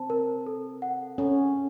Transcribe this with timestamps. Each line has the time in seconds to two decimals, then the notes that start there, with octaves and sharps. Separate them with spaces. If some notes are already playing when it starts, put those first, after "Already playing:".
Already playing: C4 A5
0.10 A#4
0.47 A4
0.82 F#5
1.18 C#4 A4